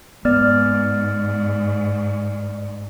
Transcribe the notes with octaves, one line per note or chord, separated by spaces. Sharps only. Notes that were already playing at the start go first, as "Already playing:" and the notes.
G#2 B3 D5 F6